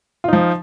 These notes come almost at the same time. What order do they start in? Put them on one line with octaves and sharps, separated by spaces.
F4 D#4 F3